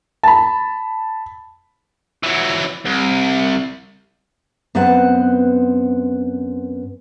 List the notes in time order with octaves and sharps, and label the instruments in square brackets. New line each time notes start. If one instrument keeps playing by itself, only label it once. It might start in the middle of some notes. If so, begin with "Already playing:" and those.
[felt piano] A5 B5
[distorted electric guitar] E3 F#3
C2
[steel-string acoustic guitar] F#2 B3 C4 B4 C5 F#5